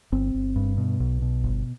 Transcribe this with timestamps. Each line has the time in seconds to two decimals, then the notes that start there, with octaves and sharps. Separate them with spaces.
0.12 G1 C4
0.34 G1
0.56 G2
0.77 B2
1.00 B1
1.22 B2
1.44 G1